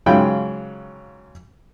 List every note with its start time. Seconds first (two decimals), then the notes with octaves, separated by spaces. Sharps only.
0.06 G#2 C#3 F#3 F4 G5 B5